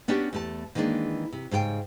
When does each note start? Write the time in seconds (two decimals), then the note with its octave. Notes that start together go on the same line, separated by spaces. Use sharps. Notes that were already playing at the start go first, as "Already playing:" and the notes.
0.08 B3 C#4 D4 F#4 G4
0.33 E2 A3 A5
0.75 D#3 E3 G#3 A#3 D4
1.33 C3
1.51 G#2 C#3 G#4 G5 G#5